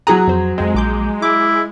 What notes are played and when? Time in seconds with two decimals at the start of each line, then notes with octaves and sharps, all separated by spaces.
0.07 F#3 G#4 A#5 D#6 F#6
0.28 F2 C5
0.58 F2 G#3 C4
0.74 A#1 D6 G6
1.22 E4 D6